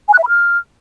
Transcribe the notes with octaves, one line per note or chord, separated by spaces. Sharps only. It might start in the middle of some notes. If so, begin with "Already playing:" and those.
G#5
F#6
E5
B5
F6